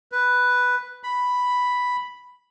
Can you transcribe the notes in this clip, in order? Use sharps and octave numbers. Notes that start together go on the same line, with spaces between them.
B4
B5